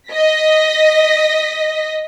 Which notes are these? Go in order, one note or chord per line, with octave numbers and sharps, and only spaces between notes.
D#5 A#6 B6